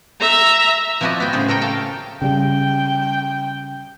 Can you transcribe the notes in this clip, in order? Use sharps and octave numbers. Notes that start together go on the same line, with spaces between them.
E5 A#5
F3 C4 E4 F#4 D5 D#5
B3 G5
A2 C#3 G#4 C5
A4 A#4 C#5 G5
A3 F5 G5 A5
C#3 G3 G5